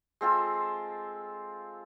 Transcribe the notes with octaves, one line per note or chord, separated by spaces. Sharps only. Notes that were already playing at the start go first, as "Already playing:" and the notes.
G#3 C4 F4 A4